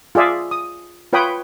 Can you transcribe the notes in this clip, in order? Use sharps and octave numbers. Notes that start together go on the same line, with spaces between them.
F4 G#4 D5 E5
D#6
F4 B4 C#5 G5 B5 D#6